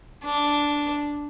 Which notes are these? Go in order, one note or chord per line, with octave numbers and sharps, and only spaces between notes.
D4